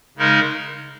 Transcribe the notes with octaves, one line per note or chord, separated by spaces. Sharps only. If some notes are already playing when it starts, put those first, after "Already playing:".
C#3 G#3 D#4 A#4